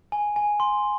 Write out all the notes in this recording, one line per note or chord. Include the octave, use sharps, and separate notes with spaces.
G#5
G#5
C6